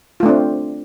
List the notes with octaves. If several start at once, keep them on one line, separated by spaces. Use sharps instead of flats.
A3 C4 D4 F4